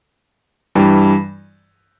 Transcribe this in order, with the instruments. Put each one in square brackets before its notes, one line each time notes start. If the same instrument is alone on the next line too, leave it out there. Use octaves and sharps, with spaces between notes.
[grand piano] G2 E3 G3